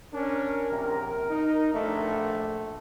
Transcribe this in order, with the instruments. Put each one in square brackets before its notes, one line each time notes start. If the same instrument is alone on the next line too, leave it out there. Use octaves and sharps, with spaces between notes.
[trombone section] C#4 D4 [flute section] A#4
[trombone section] A#1 C3 C4
D#4
A#1 A3 D4